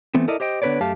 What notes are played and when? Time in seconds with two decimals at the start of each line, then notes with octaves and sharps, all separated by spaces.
0.15 E3 A3 B3 C4
0.28 E4 A4 A#4 D5 D#5
0.40 G4 C5 D#5 G5
0.62 D3 B3 A#4 B4 C#5 D5
0.81 F#2 A3 G4 F5 A5